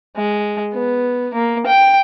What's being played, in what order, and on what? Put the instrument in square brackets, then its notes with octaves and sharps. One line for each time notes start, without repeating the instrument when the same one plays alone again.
[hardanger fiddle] G#3
B3
A#3
G5